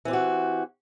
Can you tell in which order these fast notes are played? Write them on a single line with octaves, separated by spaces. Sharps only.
E3 C4 G4 F#4